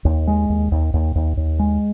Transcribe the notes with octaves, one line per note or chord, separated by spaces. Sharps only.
D#2
G#3
D#2
D#2
D#2
D#2
D#2
G#3